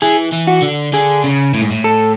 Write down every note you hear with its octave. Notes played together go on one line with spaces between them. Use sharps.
E3 G#4
E3
F#4
D3
D3 G#4
C#3
A2
G#2
A2
A4